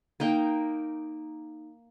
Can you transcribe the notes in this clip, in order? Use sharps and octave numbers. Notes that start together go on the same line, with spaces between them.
A#3 D#4 G5